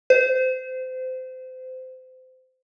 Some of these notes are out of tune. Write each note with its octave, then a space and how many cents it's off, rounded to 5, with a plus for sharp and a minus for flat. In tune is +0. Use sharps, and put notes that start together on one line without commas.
C5 -25